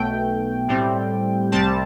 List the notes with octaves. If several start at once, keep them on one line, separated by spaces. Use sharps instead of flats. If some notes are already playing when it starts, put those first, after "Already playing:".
Already playing: B1 B2 A3 G5
A2 G3 C4
C2 C3 G3 C4 A5